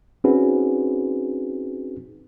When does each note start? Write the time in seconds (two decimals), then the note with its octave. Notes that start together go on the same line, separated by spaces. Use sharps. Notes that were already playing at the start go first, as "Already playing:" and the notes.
0.24 C4 C#4 D#4 F#4 G#4 B4